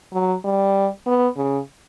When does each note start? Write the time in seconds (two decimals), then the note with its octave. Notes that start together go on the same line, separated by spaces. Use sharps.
0.13 F#3
0.45 G3
1.06 B3
1.37 C#3